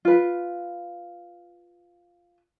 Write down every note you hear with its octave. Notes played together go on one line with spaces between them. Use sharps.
F4 B4